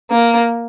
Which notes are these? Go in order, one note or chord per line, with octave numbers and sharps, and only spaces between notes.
A#3